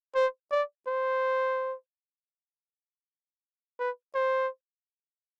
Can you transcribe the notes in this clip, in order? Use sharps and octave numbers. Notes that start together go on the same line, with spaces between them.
C5
D5
C5
B4
C5